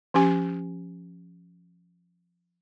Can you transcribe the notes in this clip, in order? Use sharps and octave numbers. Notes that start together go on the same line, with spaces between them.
F3 C#4 G4 G#5